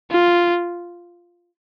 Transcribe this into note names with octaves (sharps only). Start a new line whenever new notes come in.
F4